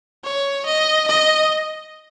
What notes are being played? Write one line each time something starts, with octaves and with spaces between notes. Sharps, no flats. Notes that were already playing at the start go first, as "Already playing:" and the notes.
C#5
D#5
D#5